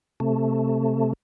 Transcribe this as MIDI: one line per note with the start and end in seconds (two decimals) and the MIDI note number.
0.20 1.13 48
0.20 1.13 57